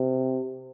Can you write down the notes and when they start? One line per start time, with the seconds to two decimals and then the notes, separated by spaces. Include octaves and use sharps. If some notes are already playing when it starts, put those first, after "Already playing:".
Already playing: C3